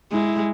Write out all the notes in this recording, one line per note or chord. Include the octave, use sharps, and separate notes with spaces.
G#3 E4